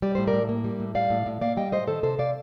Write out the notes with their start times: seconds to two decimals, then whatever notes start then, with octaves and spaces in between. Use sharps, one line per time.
0.02 G3 D5
0.15 A2 C5
0.27 A#4 D5
0.33 A2
0.49 A#3
0.64 G3
0.80 A2
0.95 G3 D5 F5
1.10 A2
1.26 A2
1.41 A#3 D5 F5
1.57 G3 D#5 G5
1.72 A2 C5 D#5
1.87 D#3 A4 C5
2.03 C3 A4 C5
2.18 C3 D5 F5